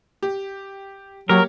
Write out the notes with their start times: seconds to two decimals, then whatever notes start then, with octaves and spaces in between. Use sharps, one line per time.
0.23 G4
1.29 F#3 A#3 G4 A#4 C#5